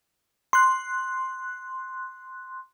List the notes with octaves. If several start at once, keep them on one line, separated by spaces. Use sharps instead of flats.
C6 F#6